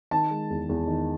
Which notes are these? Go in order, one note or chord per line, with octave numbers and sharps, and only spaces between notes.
D#3 A5
G#3
E2
E2
D#3